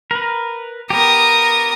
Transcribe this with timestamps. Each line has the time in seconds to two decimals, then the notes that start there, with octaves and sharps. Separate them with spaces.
0.11 A#4 B4
0.90 B3 G4 A#4 D#6